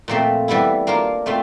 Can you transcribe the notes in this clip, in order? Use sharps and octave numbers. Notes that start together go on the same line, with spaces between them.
A#2 F3 A3 C4
E3 G3 B3 E4
A#3 D4 F4 A#4
A3 C4 F4